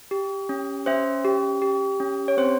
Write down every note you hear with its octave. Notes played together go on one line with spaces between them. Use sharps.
G4
C#4
C#4 C5 E5
G4
G4
C#4
C#5
C4 C5